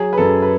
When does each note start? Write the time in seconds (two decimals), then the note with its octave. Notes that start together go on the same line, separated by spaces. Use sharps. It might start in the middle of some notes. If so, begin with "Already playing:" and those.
Already playing: F#3 G#4
0.13 B4
0.18 F#2 A4
0.42 B4